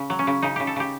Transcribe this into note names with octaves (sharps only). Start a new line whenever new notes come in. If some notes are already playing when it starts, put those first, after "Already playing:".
Already playing: C#3
F#3
C#4
C#3
C#3 D#4
C#3 G4
A4
C#3 G4